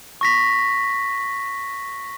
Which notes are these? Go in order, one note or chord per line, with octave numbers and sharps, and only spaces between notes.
C#6 A#6 B6